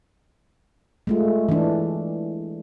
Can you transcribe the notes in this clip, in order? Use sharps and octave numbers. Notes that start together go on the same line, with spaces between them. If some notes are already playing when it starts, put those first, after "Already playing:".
G#3 A3 F4
E3 D4